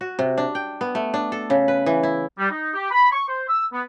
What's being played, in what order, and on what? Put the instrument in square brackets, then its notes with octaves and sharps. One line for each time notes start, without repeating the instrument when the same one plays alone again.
[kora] F#4
C3
D4
G5
B3
A3
D4
A4
C#3
B4
E3
E4
[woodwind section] G3
D#4
G4
B5
C#6
C5
E6
B3